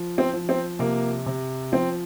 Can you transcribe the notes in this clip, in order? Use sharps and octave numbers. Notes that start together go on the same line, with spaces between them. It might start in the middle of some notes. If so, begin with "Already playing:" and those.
Already playing: F3
C4
F3
C4
C3 A#3
C3
F3 C4